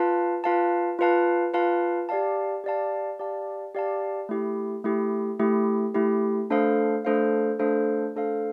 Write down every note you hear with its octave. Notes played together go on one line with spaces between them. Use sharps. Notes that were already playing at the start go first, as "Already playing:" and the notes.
Already playing: F4 B4 F5 A5
F4 B4 F5 A5
F4 B4 F5 A5
F4 B4 F5 A5
G4 D5 F5 A5
G4 D5 F5 A5
G4 D5 F5 A5
G4 D5 F5 A5
A3 E4 G4
A3 E4 G4
A3 E4 G4
A3 E4 G4
A3 D4 A4 C5 F5
A3 D4 A4 C5 F5
A3 D4 A4 C5 F5
A3 D4 A4 C5 F5